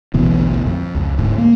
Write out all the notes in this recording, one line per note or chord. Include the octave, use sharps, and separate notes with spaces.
A1 D2 B2 E3
F2
C#2
D1 D2 G#2
A#3